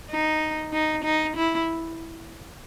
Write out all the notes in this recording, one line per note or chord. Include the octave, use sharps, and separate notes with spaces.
D#4
D#4
D#4
E4